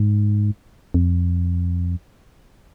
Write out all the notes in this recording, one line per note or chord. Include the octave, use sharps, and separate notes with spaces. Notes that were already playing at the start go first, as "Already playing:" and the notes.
Already playing: G#2
F2